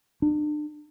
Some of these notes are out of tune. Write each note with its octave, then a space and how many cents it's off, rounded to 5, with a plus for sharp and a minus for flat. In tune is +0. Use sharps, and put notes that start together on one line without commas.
D4 +35